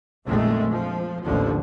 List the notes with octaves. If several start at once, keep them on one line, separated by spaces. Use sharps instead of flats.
A#1 F2 A#2 D#3 G#3 A3
F3
A1 D#2 D3 F3